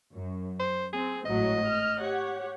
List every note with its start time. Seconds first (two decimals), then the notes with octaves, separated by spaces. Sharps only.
0.14 F#2
0.59 C5
0.93 C4 G#4
1.26 G#1 A2 F#3 D#5
1.68 F6
2.00 G4 C#5 F#5